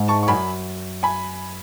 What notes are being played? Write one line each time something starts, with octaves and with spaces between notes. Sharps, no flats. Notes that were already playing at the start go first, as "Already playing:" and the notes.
Already playing: G#2
A5 C#6
C#6
F#2 G#5 B5
G#5 B5